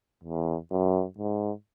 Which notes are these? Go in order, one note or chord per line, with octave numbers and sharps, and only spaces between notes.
E2
F#2
G#2